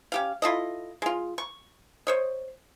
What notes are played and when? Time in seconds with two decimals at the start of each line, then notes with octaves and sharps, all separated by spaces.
0.12 C#4 G4 F5
0.42 E4 F4 A4 D#5
1.02 G#3 F4
1.38 C#6
2.07 C5 C#5 D#5